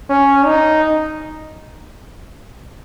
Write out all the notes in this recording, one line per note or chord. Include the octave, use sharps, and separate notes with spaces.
C#4
D#4